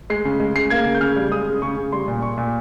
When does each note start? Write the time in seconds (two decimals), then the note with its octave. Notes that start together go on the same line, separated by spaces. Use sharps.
0.10 G#3 C7
0.25 C#3
0.40 G#3
0.56 C#3 C7
0.70 A#3 G#6
0.86 C#3
0.95 G6
1.01 C#3 F6
1.16 G3
1.31 G#3 D#6
1.47 C#3
1.62 C#3 C#6
1.77 C#3
1.92 G3 C6
2.08 A#2
2.22 A#2 C#6
2.38 A#2